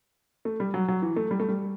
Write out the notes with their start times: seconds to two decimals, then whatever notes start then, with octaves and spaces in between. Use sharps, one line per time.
0.45 A3
0.60 G3
0.74 F#3
0.88 F#3
1.02 E3
1.16 A3
1.31 G3
1.40 A3
1.49 G3